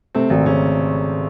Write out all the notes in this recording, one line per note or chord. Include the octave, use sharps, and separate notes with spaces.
C3 A3 C4
G#1
G#1 C#3 C#4